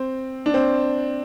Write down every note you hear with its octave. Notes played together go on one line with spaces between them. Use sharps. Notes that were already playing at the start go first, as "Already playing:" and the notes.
Already playing: C4
D4
C4